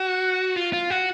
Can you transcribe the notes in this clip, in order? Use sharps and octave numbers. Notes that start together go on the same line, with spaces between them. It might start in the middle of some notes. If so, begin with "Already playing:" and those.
Already playing: F#4
F4
F4
F#4